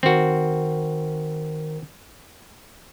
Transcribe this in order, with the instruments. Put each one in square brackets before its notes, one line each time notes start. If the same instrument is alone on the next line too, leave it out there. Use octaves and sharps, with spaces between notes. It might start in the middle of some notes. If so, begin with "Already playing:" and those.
[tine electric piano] D#3 A#4 [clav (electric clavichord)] C4 F#4